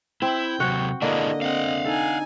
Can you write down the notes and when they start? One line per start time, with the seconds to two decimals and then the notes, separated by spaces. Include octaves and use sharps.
0.22 C4 E4 G5
0.60 C3 F#3 F#4 F#5
1.02 D3 A#3 D4 E4 G#4 D#5
1.42 C4 D#5 F5 F#5
1.85 D#4 A4 G#5